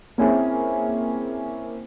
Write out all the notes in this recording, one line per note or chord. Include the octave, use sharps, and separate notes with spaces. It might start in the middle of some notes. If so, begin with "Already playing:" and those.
A#3 C4 C#4 E4 G#4